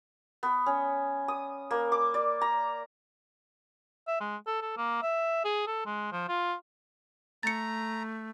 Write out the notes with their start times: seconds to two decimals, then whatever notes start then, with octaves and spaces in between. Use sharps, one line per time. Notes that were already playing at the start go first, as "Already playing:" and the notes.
0.43 B3
0.66 C#4
1.28 D#6
1.71 A#3
1.92 D6
2.14 D5
2.41 A#5
4.08 E5
4.20 G#3
4.47 A4
4.62 A4
4.77 A#3
5.02 E5
5.44 G#4
5.67 A4
5.86 G#3
6.12 F3
6.29 F4
7.43 A3 A#5 A6 C#7